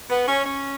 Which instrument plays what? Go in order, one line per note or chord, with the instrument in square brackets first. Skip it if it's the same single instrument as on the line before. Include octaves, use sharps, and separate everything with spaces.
[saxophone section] B3
C#4
C#4